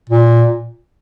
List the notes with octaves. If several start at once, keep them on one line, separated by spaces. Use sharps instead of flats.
A#2